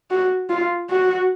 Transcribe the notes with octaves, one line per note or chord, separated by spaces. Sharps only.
F#4
F4
F#4